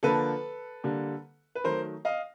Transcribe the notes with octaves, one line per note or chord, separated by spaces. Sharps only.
D3 F3 A#3 A4 B4
D3 G3 A#3
B4
D#3 F#3 A3 A#4 C5
D#5 F5